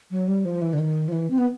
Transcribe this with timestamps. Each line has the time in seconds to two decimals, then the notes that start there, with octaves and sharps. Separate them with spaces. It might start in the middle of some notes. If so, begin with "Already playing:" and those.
0.11 F#3
0.28 G3
0.45 F3
0.61 E3
0.73 D3
0.78 D#3
1.08 F3
1.12 E3
1.30 C4
1.38 B3